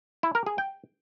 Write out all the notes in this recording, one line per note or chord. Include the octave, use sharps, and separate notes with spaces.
E4
A#4
G#4
G5